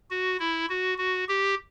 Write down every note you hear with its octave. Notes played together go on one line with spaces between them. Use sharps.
F#4
E4
F#4
F#4
G4